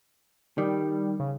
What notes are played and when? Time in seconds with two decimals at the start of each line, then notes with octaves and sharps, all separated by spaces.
0.58 D#3 G3
1.19 C#3